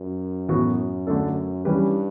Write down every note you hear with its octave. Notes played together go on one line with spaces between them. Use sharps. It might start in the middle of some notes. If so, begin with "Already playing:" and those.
Already playing: F#2
A2 E3 B3 F#4
D3 A3 D4 A4
G2 E3 G3 C#4 G4 B4